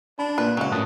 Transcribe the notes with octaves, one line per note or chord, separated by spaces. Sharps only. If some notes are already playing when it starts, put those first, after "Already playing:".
D4 B5
A#2 B4
C#2 F#3 F#5
F#2 A2 A5 D#6